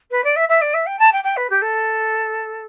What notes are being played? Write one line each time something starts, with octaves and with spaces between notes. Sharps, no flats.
B4
D5
E5
E5
D5
E5
G5
A5
G5
G5
B4
G4
A4